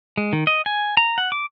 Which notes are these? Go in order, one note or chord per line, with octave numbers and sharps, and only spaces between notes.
G#3
D#3
D#5
G#5
A#5
F#5
D6